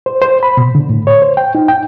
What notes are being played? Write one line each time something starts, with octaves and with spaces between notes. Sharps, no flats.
C5
C5
B5
B2
D3
A2
C#5
C5
G5
D#4
G5